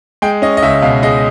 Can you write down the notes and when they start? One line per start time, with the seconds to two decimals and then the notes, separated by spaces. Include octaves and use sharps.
0.22 G#3 G5
0.42 C#4 D#5
0.57 D#5
0.62 C#2 E5
0.82 B2 F5
1.02 G#3 D#5